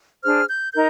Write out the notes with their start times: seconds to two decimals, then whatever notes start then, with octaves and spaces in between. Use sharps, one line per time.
0.22 D4 G#4 C5 F6
0.48 G6
0.73 D#4 A#4 G6